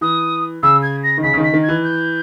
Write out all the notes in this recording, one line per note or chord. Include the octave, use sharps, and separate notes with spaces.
E3 D#6
C#3 E6
G#6
A#6
D#3
C#3 B6
C#3
D#3
B6
D#3
G#6
E3
G6